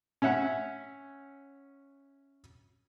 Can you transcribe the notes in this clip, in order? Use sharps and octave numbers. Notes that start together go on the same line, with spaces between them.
C#4 C#5 E5 F#5